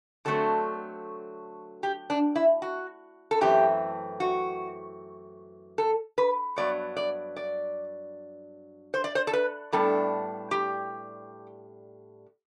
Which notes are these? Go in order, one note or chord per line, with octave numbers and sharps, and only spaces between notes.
D3 F#3 A3 C4 A4
G4
D4
E4
F#4
A4
F#2 E3 A3 C4 G4
F#4
A4
B4
G2 F#3 B3 D5
D5
D5
C5
D5
C5
A4
B4
A2 G3 B3 D4 A4
G4